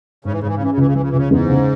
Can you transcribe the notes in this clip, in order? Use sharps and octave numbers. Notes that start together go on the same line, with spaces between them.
G#2 C#3
E3
G#2 C#3
E3
C#3
E3 C#4
C#3
C#2 E3
C#3
E3 F3
C#3
E3
C#2 C#3
E2 G#2
C#3